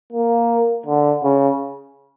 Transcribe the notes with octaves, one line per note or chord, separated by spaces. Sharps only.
A#3
D3
C#3